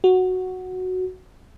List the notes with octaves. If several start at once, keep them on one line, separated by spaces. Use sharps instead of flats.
F#4